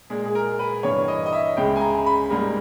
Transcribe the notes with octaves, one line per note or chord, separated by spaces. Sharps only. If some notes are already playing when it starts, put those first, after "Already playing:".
A#2 G#3 G#4
G#4
A#4
B4
G2 E3 A#3 C#5
D#5
D#5
E5
C#2 C#3 G#3 G5
G#5
A#5
B5
G#2 G3 A#3